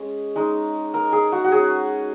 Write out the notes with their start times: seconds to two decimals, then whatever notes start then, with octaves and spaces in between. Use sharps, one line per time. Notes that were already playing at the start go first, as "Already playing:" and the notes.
Already playing: G#3 C#4
0.36 G#3 D#4
0.94 A#4
1.12 G#4
1.32 F#4
1.44 F#4
1.51 G#3 C#4 G#4